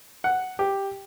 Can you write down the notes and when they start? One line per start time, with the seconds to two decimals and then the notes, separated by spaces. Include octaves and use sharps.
0.24 F#5
0.59 G4